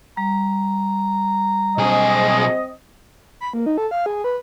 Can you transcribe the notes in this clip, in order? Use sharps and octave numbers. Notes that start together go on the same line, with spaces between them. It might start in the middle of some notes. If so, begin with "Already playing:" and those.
G3 A#5
B1 C4 G#4 D#5
B5
A#3
D#4
A4
F5
G#4
B4